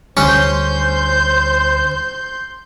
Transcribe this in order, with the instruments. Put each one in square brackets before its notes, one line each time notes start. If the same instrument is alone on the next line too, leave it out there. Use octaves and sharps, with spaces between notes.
[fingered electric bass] D2 D3 G3 [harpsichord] C#4 [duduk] C5 [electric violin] C6 G6